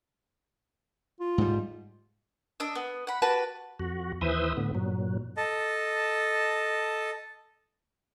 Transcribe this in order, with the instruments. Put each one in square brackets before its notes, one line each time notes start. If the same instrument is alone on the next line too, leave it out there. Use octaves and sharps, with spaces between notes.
[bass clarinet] F4
[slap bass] G#2 G3
[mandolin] D4 D#5 E6
B3
F#5 B5
F#4 G4 B4 A5
[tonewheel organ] F2 F#4
D#2 E3 B4 C5 E5 D#6
A2 D3 B3
G2 A#2 F#3
[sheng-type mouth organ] A4 D#5 A5